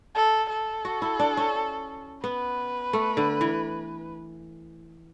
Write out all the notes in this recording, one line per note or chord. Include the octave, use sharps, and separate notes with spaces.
A4
A4
F#4
E4
D4
C#4
B3 B4
A3
D3
E3